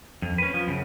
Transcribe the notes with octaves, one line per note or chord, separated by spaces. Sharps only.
F2
C#4 B4
F3
F#2 C#3